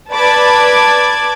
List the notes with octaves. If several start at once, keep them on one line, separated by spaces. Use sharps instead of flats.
B4 D5 A5 B5 D6 G#6